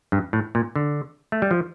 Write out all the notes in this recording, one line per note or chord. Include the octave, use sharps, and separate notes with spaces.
G2
A2
A#2
D3
A3
G3
F3